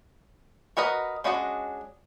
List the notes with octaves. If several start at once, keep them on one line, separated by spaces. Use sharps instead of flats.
F#4 A#4 B4 D#5
G#3 C#4 D4 F#4 D#5